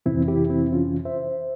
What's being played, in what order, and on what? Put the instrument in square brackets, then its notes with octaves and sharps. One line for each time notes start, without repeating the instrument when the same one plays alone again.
[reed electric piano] F2 C3 E3 C4 E4
E4 G4
C4 E4
C#4 F4
C5 E5